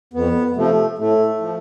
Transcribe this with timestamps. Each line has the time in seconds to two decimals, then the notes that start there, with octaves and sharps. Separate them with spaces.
0.14 F2 B3
0.56 C3 F3 A3
0.98 A2 A3
1.41 F3